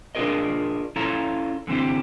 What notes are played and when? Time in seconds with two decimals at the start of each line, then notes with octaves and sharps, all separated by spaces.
0.15 D4 F4 F#4 G#4 A#4 D#5
0.96 C#4 E4 F4 A4 A#5
1.67 D3 E3 C4 E4 G4